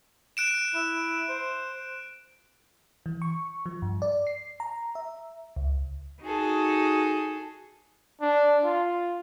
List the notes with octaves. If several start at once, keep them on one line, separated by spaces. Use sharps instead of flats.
F#6 D7 E7
E4
C5
E3
C#6
F3
G2
D5
C7
A#5
E5
C#2
D#4 F#4 G#4 A4
D4
F4